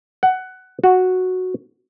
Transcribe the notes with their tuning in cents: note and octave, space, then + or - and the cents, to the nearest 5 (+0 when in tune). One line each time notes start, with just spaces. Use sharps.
F#5 +15
F#4 -5